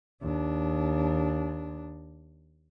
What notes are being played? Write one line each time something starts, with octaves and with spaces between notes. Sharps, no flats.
D#2 D4